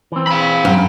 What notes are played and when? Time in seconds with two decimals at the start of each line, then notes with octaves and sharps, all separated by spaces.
0.12 E3 C4
0.27 F5 B5
0.65 F#2